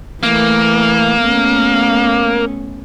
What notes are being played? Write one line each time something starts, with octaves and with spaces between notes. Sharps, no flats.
E3 A3 A#3
A3 B3 C#4